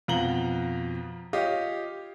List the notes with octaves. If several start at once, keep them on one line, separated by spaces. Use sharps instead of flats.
F2 B2 F4 A#5 F#7 G7
F4 G4 C#5 D#5 F5